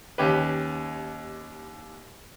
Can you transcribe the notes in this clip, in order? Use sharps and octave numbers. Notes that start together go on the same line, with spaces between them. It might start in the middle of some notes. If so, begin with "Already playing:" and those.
D#2 C#4 G4 B4